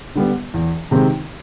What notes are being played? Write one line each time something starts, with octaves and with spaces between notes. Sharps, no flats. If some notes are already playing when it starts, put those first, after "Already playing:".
D3 G3 B3
E2
C3 D#3 G#3 C4